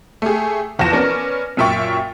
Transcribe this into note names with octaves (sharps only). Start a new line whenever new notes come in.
A3 G4 G#4
G1 E2 F3 A5 A#6 E7
B3 C#4 A#4 D5
F#2 A#2 E5 G5 C#6 A6